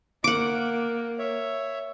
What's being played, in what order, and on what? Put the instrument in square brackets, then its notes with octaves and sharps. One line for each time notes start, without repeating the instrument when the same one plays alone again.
[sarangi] A#3 [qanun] F#5 D6
[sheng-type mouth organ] C#5 E5